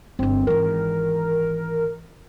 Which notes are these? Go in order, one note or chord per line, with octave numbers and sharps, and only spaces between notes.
G1 G2 C4
G#1 E3 A#4